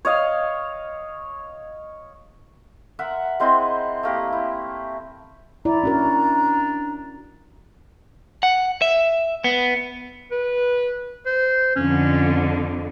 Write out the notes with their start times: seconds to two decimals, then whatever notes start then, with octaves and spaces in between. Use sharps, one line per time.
0.05 C#5 D#5 F5
2.99 A#4 E5 F#5
3.40 G#3 C4 E4 D#5
4.03 A3 A#3 G4
4.33 E4
5.65 E4 D5 A#5
5.83 C#4 D4 F#4 A#4
8.43 F#5
8.82 E5
9.44 B3
10.31 B4
11.26 C5
11.76 F2 D3 C#4